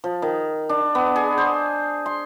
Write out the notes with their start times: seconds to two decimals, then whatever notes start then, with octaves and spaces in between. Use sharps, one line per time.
0.04 F3
0.22 D#3
0.69 D4
0.95 B3
1.16 G#4
1.38 C5
2.06 C6